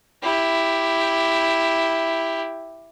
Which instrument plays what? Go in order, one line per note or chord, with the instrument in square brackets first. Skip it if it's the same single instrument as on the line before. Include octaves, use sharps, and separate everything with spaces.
[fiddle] E4 G4